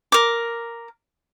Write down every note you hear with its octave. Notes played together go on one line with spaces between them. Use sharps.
A#4 D6